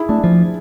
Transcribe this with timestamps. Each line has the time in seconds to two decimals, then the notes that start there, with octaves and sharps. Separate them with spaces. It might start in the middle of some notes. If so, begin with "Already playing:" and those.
Already playing: E4 G#4
0.09 A3 D4
0.24 F3